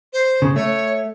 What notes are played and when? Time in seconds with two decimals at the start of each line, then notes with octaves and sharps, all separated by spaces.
0.13 C5
0.42 C#3
0.56 A3 C#5